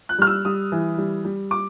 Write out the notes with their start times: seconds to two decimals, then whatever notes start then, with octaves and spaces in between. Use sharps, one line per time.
0.09 F#6
0.18 G3 F6
0.27 E6
0.45 G3 D#6
0.72 E3
0.98 G3
1.25 G3
1.51 D6